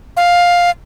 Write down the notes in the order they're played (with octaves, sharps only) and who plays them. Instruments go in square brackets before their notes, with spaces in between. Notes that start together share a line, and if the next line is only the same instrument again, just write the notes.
[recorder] F5